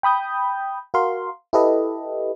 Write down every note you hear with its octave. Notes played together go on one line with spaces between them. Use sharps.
G5 B5 D#6 G6
F#4 A#4 F5 C6
E4 G4 A4 B4 D#5